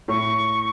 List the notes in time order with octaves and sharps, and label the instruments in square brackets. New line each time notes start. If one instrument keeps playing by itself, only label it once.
[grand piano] A2 [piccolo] C#6